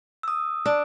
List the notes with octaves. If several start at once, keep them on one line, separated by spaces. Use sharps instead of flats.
D#6 E6
D4